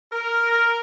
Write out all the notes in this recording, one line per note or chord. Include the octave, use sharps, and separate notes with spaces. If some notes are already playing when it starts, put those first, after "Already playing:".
A#4